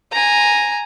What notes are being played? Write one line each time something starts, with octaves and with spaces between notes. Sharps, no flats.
G#5 A#5